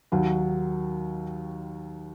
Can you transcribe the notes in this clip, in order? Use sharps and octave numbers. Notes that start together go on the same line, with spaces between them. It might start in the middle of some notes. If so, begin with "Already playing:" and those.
D#2 D#3 F#3